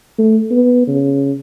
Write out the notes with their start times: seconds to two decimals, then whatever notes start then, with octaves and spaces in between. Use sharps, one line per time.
0.18 A3
0.50 B3
0.87 C#3